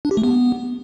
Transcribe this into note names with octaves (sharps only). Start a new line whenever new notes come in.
D4
G4
A3
B3